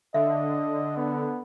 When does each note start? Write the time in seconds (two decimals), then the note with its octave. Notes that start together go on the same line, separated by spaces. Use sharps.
0.14 D3 D#5 E5
0.97 B3